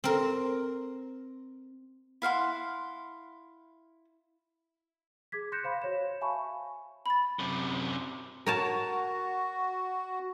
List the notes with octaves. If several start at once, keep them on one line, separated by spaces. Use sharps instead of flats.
C4 A#4
E4 F5 F#5 C6
G#4 D6 G#6 B6
C6 F#6 G6 A#6 C#7 E7
C5 F5 B5
F#4 C#5 E7
E5 F5 G#5 A5 B5 C#6
B5 A6
F#2 C3
F#4 A#4 C#5 A5